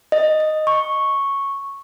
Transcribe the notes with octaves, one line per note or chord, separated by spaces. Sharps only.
D#5
D#5
C#6